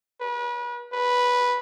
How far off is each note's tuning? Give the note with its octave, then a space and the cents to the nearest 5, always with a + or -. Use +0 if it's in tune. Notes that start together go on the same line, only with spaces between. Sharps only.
B4 -35
B4 -5